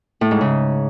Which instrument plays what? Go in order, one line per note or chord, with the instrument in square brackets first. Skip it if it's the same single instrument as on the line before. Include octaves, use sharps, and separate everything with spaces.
[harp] A2
G#2
C#3